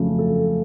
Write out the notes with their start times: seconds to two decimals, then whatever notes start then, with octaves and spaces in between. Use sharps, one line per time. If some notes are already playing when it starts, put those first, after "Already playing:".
Already playing: F2 C#3 F#3 A3
0.19 A4